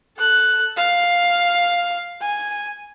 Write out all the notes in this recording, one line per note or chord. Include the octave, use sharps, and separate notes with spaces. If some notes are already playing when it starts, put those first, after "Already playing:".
A4 F#6
F5
G#5